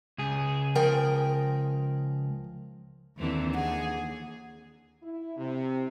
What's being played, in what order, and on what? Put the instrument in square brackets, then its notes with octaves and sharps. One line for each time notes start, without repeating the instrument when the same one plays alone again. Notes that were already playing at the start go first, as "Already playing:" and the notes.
[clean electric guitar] C#2 G#4
[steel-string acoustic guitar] F3 A#4 G5
[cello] D#2 [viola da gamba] D3 E3 C4
[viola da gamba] G#4 [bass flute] F#5
[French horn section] E4
C3